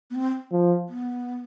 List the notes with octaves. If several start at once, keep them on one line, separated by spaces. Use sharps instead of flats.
B3
C4
F3
B3